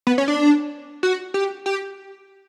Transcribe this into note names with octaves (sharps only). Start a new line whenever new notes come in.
B3
C#4
D4
F#4
G4
G4